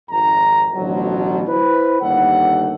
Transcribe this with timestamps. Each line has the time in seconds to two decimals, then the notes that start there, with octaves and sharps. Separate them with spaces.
0.10 G#1 F2 A#5
0.75 A1 D2 B2 F3 F#3
1.47 E4 B4 C5
2.01 G1 D#2 G3 A4 F#5